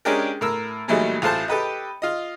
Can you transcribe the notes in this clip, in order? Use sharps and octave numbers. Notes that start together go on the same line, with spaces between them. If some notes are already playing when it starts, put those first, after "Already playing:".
G#3 C#4 D4 G4 G#4 A#4
A2 A#4 E6
A#2 E3 F#3 G3 A3 D#4
A1 F4 A4 C5 A5
G4 A4 B4 D#5
F4 D#5